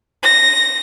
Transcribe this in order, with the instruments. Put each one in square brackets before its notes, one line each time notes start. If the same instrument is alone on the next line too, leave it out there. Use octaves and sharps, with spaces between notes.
[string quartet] A#6